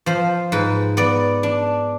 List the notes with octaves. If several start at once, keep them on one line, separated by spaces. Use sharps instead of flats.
F3 C5
G#2 B4
B3 D5
D4